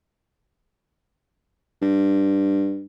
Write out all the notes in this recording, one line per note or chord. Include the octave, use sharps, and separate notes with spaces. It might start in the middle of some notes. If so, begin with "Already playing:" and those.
G2